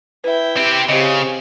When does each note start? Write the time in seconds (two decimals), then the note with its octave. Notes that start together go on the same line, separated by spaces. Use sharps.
0.24 E4 B4 E5 G5
0.57 C4 G4
0.89 C#3 C4 G4 D#5